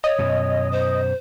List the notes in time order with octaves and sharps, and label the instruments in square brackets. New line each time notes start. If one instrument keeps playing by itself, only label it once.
[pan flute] C#5 [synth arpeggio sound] D#5
[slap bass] F#2 B2
[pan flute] C5